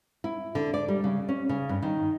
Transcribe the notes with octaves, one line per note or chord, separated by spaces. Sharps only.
E4
D3
D5
G3
C#3
C#4
C#3
G2
D#3